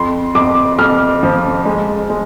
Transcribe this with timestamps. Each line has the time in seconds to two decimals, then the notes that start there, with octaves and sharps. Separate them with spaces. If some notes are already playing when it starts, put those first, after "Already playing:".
Already playing: F2 C6
0.35 F2 D6
0.79 F2 F6
1.23 F3
1.65 G#3
2.10 G#3